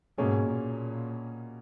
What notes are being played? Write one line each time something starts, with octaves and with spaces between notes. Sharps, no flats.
G#2 B2 A#3 C#4 G#4
A#2